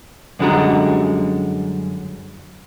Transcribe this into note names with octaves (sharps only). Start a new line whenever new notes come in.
F#2 D3 G3 G#3 F#4 A#5